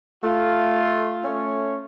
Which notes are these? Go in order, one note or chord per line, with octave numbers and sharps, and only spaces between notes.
A3 F4
A3 C#4 C#5